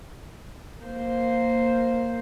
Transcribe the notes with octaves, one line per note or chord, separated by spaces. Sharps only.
A#3 C5